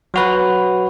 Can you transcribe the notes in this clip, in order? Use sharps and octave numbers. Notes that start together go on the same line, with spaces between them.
F#3 F#4 B4